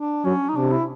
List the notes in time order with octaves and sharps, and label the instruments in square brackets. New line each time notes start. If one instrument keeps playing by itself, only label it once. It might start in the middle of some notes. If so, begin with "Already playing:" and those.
Already playing: [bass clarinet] D4
[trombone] F#3 [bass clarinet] C#4
[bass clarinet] D#4
[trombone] C3 [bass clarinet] D4
[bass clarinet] E4